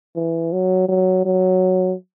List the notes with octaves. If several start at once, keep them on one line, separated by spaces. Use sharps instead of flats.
E3
F#3
F#3
F#3